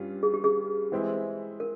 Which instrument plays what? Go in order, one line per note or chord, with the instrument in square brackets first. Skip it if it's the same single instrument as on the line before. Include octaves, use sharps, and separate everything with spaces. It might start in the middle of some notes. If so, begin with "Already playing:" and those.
Already playing: [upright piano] G2 G3 C#4 F4
[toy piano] G#4
G4
G#4
[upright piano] E3 G#3 C4 E4
[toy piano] A#4